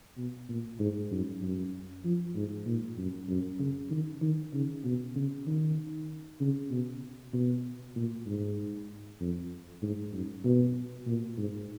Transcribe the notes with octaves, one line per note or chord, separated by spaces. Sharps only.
B2
A#2
G#2
F#2
F#2
F3
G#2
A#2
F#2
F#2
C#3
D#3
D#3
C#3
B2
C#3
D#3
C#3
B2
B2
A#2
G#2
F2
G#2
F#2
B2
A#2
G#2